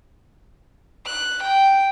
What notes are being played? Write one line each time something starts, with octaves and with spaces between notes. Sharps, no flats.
F#6
G5